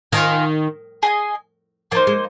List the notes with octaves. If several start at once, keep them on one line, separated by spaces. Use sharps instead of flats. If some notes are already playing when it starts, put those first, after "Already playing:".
D#3 F4 A#4 F5 G#5
G#4 D#5 G#5
F3 A#3 D#4 C5
G#3